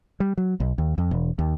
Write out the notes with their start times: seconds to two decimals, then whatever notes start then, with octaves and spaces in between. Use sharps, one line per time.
0.20 G3
0.37 F#3
0.60 B1
0.78 D#2
0.98 F2
1.11 E1
1.39 D#2